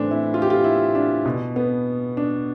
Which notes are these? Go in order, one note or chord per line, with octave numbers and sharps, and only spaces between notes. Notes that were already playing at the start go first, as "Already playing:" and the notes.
Already playing: A2 E3 C4 D4
E4
F4
G4
F4
E4
D4
B2
B3
D4